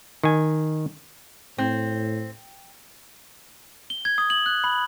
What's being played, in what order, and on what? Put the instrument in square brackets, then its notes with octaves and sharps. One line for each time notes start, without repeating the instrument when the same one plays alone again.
[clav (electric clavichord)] D#3 G#5
[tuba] A2 [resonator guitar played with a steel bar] C4
[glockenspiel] G7
G#6
D#6
F#7
F#6
B5